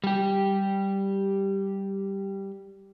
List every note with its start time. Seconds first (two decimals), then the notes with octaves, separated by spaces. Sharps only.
0.04 G3 G4